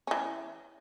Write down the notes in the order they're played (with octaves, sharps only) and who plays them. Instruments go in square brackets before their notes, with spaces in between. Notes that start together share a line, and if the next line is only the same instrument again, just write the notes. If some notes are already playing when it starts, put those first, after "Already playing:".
[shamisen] E3 C#4